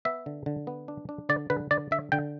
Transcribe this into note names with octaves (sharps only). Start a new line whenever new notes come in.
B3 E5
D3
D3
B3
D4
D4
D3 D5
D3 B4
D3 D5
D3 E5
D3 G5